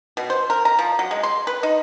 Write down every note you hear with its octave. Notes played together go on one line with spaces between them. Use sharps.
B2
C5
A#4
A#5
F3
F#3
G#3
C6
B4
D#4